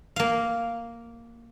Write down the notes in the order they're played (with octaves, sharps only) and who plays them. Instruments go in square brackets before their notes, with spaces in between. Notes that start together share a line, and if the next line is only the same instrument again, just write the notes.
[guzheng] A#3 F5